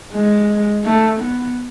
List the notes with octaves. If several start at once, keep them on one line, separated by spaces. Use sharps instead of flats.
G#3
A3
B3